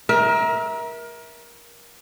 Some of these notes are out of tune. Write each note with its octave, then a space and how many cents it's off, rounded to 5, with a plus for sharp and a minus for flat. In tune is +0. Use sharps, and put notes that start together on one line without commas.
A#4 +25 E5 -20